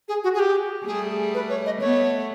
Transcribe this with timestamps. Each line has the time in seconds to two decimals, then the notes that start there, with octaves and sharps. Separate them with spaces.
0.08 G#4
0.24 F#4
0.35 G#4
0.39 G4
0.86 G3 A3 G#4
1.34 B4
1.50 C#5
1.66 D#5
1.81 A3 B3 C#5